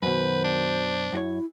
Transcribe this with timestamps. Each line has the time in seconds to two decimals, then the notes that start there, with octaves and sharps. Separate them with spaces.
0.02 F#2 B2 D#3 B4 C5
0.44 D4
1.13 F#2 E4 F#4 C#5